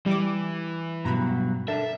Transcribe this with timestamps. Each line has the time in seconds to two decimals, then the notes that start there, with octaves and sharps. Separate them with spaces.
0.06 E3 G3 D6
1.05 G2 B2 F#3 A#5 B5
1.68 D4 A4 A#4 E5